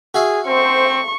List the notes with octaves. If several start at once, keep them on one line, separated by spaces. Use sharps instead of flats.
F#4 G#4 E5 F5
C4 C5 C#6